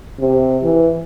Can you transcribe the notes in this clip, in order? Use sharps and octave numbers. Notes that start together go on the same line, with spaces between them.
C3
E3